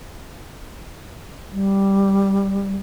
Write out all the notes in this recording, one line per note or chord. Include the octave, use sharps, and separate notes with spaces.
G3